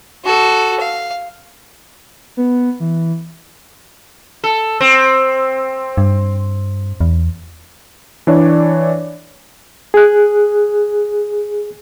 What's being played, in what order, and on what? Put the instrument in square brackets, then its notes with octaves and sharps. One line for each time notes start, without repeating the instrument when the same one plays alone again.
[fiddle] F#4 A4
F5
[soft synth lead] B3
E3
[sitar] A4
C4
[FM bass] G2
E2
[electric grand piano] E3 D4 C#5 D5
[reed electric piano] G#4 F#6